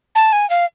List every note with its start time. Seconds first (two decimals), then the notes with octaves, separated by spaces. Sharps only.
0.15 A5
0.33 G#5
0.50 F5